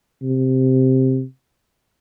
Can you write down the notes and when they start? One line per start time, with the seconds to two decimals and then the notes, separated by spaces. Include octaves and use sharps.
0.23 C3